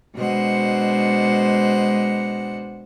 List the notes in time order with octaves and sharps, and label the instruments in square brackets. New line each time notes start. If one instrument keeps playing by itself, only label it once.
[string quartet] B2 G#3 D4 C5 F#5